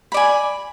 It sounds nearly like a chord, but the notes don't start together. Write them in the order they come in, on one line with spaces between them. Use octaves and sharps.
B5 D5 G#5